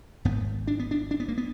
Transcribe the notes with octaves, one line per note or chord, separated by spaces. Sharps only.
G#1 G#2 B3
D4
B3
D4
D4
B3
A#3
B3